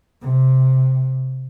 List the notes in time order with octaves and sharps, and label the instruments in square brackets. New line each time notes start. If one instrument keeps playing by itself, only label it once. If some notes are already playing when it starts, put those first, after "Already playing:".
[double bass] C3